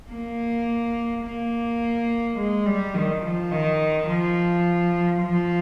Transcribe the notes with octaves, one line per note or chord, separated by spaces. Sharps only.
A#3
A#3
G#3
G3
D#3
F3
D#3
F3
F3